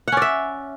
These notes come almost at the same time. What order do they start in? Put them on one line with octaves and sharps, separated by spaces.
F#5 C#4 D5 E5